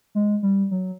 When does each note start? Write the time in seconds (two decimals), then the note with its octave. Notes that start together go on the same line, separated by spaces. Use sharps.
0.15 G#3
0.43 G3
0.71 F#3